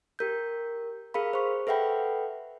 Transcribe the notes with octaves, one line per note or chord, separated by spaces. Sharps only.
G4 A#4 G6
G#4 A#4 F5 B5
C5 C#6
A4 B4 E5 F#5 G5 B5